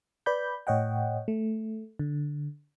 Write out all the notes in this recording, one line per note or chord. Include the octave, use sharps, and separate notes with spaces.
B4 D5 B5 G6
A2 C#5 D#5 F#5 G5
A3
D3